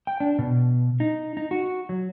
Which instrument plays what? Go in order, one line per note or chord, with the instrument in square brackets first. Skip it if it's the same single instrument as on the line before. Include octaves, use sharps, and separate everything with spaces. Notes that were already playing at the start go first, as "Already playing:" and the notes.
[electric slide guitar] G5
D4
B2
D#4
D#4
F#4
F#3